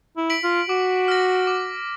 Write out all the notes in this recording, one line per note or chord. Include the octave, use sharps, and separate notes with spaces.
E4
B6 D7 F#7
F4
F#4 D6
F6 A#6
D6